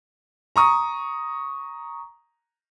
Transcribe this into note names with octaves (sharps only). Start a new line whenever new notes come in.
A#5 C#6 D#6